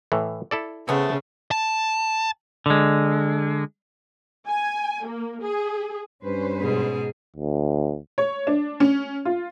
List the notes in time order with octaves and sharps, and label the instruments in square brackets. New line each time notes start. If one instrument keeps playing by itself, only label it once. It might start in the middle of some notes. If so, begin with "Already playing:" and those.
[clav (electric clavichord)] A2 E3
E4 A4 D5
[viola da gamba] C#3 [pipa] A3 B3 C4
[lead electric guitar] A5
[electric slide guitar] D3 G#3
[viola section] G#5
A#3
G#4
[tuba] G2 [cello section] C#4 B4 C5
[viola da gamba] G#2 B2 G#4
[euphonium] D2
[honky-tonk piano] C#5
D4
C#4
F4